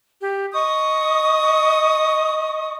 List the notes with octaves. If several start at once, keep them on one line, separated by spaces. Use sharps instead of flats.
G4
D#5 C#6 D#6